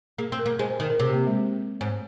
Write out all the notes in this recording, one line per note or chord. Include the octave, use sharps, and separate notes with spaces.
A#3 G#4
C4
A#4
A#3
G#3 C5
C5
D#3 A#4
A#4
C3 G#4
A#3
G#3
G#2